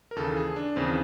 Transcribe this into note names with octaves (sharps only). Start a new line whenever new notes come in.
A#4
D#2 C#3 E3 A4
G#4
D4
D#2 C#3 E3 C4